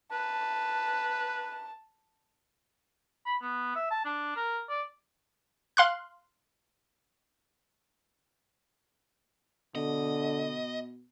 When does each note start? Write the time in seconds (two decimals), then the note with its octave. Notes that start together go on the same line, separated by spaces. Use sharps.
0.12 B4 A5
3.26 B5
3.41 B3
3.76 E5
3.91 A5
4.05 D4
4.36 A#4
4.69 D5
5.77 F5 C6 F#6
9.75 B2 D3 D#5